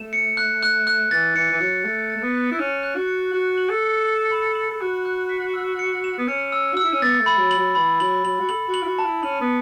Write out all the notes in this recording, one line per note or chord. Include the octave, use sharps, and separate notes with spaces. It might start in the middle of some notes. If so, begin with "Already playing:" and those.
Already playing: A3 E7
C#7
F#6
F#6
F#6
E3 A6
E3 C#7
E3
F#3 C#7
A3 A6
A6
A3
B3
F#6
E4
C#4 F#6
F#6
F#4
C#7
F#4 F#6
F#7
A4
C#7
F#7
B5
F#7
A4
F#4 F#6
F#6
B6
E6
C#7
E7
B3
C#4 C#7
E6
F#4 E6
E4
C#4
B3 A6
A3
B5
F#3
F#7
F#3
E3 B5
F#3 F#7
F#3 F#7
F#4
A4 F#7
F#4
F#7
E4
F#4
A5
E4
C#4 F#7
B3